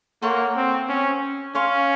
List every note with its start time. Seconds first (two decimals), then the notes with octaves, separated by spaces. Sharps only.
0.22 A#3 A4 C#5 F#5 C6
0.56 C4
0.89 C#4
1.55 C#4 C#5 F5 C6